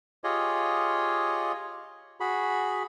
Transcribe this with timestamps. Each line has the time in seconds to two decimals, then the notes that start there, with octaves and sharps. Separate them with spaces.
0.24 F4 G4 G#4 C#5 D#5
2.20 F#4 G#4 B5